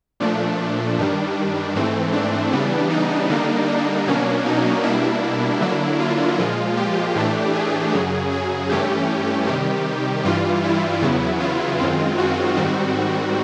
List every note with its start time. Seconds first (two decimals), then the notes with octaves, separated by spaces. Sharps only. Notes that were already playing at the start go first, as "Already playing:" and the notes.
0.20 A#2 F3 A3 D4
0.98 G2 D#3 G3
1.75 G#2 E3 A3 C4
2.13 D4
2.52 C#3 E3 G3 B3
2.90 D#4
3.30 D3 G3 A#3 D4
3.68 D4
4.07 B2 F#3 A#3 C#4
4.46 D#4
4.83 B2 G3 A#3 D4 E4
5.61 D3 F#3 A#3 D4
6.00 F4
6.38 A#2 F3 G#3
6.77 G4
7.16 A2 E3 A3 D4
7.55 G#4
7.93 F#2 C#3 F#3
8.32 G#4
8.70 G2 E3 A3 C#4 G4
9.47 C3 D#3 G3
10.25 G2 E3 G3 F4
10.63 E4
11.01 E2 C#3 F#3 B3
11.40 F4
11.79 F#2 D#3 G#3 C4
12.18 F#4
12.57 G#2 D#3 G3 C4